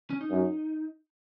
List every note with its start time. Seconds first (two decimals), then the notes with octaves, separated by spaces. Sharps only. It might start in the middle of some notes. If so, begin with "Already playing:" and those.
0.10 C#4
0.21 D#4
0.31 F#2